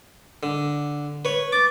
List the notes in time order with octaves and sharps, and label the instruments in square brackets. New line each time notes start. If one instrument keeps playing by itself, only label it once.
[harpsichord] D3
B4 C#5
[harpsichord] D6 [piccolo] A6